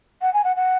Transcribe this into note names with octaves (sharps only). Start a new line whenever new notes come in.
F#5
G#5
F#5
F#5